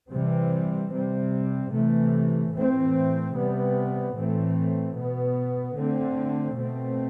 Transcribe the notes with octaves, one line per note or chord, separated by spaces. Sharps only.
C3 E3 G3 C4
C3 G3 C4
C3 E3 A3
A2 E3 A3 C4
C3 G3 B3
A2 E3 A3 C4
B2 B3
D3 A3 C4
B2 A3 C4